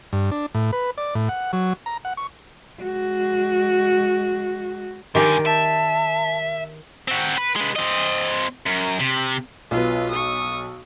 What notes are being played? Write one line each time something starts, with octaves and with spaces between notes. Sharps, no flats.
G2
D4
A2
B4
D5
A2
F#5
F#3
A#5
F#5
C#6
G#3 F#4
G2 D3 D#3 G4 D5 G#5
E5 A5
C4 F#4
B4
G#3 B4
C4 D#5
F#2
C3
B1 F4 B4
C#6 D#6